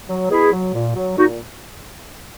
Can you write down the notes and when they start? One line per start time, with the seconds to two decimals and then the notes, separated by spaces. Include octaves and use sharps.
0.09 F#3
0.30 B2 E4 G#4
0.52 F#3
0.74 A#2
0.95 F#3
1.17 A#2 D#4 F#4